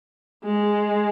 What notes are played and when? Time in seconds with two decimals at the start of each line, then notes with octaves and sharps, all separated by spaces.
0.44 G#3